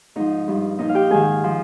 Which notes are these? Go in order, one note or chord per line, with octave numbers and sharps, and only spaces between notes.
G#2 F3 D#4 D#5
G2 F3
A#2 F3 D#4 D#5
F5
G4 G5
G#2 D#3 G#4 G#5
F3